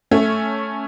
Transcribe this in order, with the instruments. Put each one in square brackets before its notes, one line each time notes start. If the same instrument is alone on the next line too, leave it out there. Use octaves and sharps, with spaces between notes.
[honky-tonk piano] A3 C#4